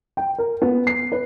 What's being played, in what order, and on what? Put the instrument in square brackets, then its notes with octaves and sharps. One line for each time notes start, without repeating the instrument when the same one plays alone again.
[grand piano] G5
A#4
B3
C7
B4